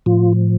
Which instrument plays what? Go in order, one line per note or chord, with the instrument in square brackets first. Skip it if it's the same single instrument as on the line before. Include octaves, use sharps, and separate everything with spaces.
[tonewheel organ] A2 F3 F4